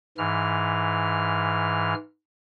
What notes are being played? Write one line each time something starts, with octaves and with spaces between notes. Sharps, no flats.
G#2 E3 F6